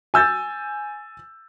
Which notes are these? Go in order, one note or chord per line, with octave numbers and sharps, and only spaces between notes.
G#5 E6 G6 A6